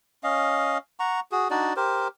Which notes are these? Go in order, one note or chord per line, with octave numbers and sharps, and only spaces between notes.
C#4 D#5 F5
F#5 A#5 C#6
F#4 G#4
D4 D#4 F#4 D5
G4 A#4 C5